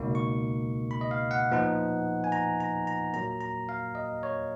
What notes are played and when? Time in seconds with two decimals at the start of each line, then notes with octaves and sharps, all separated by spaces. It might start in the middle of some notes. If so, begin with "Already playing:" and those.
Already playing: C#2 B2 A#3 D#4
0.15 C#6
0.91 B5
1.01 D#5
1.11 F5
1.31 F#5
1.52 A#2 F3 B3 D#4
2.24 G#5
2.32 A#5
2.60 A#5
2.87 A#5
3.14 A#2 F#3 A#3 A#5
3.41 A#5
3.69 F5
3.95 D#5
4.23 C#5